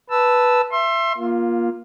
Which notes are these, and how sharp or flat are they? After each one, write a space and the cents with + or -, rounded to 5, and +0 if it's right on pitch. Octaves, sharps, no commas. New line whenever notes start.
B4 -5 A5 +0 E6 +0
E5 +25 C6 +25
A#3 +20 F4 +0